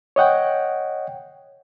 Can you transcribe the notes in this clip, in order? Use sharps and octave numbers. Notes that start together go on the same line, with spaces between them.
C#5 D#5 F#5 G5